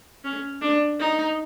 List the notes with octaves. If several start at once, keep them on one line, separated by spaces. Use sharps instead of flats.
C#4
D4
D#4